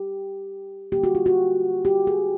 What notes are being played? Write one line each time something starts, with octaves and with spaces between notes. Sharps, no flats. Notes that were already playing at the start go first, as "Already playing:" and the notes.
Already playing: G4
D3 G3 A#3 G4
F#4
F4
F#4
G4
G#4